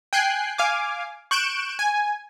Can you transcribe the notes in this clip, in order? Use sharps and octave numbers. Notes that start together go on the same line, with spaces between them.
G5 G#5 F#6 C7
F5 G#5 D6
C#6 F#6 G6 D7 E7
G#5